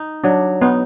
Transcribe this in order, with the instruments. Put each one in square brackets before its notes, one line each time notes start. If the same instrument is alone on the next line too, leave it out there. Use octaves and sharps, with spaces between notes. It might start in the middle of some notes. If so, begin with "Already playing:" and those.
Already playing: [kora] D#4
[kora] F#3 [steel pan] D4
[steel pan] B3 [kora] D#4